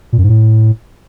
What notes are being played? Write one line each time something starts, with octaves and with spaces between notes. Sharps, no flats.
A#2
F#2
G#2
A2